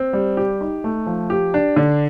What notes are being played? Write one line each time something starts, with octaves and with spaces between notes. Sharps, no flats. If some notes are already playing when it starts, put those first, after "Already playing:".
Already playing: C4
G3
G4
D#4
A3
F3
G4
D4
D3